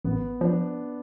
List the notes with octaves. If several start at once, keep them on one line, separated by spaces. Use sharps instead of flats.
A1 B3
F3 D4